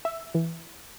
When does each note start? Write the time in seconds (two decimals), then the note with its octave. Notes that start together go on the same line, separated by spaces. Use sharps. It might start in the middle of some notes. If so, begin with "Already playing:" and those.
0.05 E5
0.35 E3